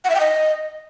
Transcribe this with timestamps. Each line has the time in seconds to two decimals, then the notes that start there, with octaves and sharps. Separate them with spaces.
0.04 F#5
0.10 E5
0.15 G5
0.20 D#5